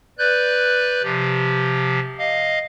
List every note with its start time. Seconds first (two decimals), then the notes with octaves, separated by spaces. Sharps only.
0.18 B4 D5 F#6 G6
1.03 C3 F3 G4
2.18 D#5 F5